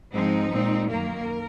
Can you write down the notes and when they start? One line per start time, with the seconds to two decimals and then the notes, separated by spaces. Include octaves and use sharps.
0.14 G#2 F3 G#3 C4 D#4
0.53 A#2 G#3 C4
0.91 F#2 D#3 A#3 A#4